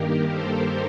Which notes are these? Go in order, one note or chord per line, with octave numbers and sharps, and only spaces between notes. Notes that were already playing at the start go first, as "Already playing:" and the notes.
Already playing: G2 D#3 A#3 G4 A#4
A4 C5